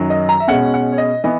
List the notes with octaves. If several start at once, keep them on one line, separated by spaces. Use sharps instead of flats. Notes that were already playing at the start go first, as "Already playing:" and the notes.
Already playing: F#2 D#3 F#3
D#5
A#5
E5
B2 G#3 C#4 F#5
F#5
C#5
D#5
E3 B3 D#5